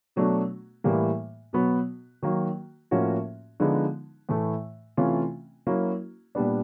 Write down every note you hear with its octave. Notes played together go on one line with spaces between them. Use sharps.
B2 F#3 A3 D4
A2 E3 G3 A#3
B2 F#3 B3
D#3 F#3 A#3
A2 F3 A#3 C#4 F#4
D3 F3 G#3 B3 D#4
A2 E3 A3
C3 E3 A3 C#4 F4
F#3 A#3 C#4 E4
A#2 G3 B3 D4